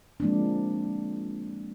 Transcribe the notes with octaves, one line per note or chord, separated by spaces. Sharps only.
F3 G#3 A#3 C4 D4